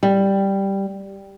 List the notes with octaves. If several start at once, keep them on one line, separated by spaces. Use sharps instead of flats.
G3